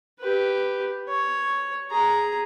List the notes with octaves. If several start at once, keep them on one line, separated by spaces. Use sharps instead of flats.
G4 B4
C#5
G#4 A#5